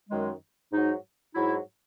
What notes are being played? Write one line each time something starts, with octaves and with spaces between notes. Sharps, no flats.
F#2 D#3 G#3
G#2 F#3 D#4
G#2 F#3 E4